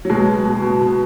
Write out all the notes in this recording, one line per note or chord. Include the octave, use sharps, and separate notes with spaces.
F#3
B2 G#3
B2
B2
B2
B2